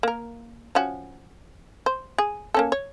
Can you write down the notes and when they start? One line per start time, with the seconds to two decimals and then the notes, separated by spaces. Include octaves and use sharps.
0.03 A#3 A#4
0.75 F3 C#4 F#4
1.86 C5
2.18 G#4
2.54 A#3 C#4 A4
2.72 C#5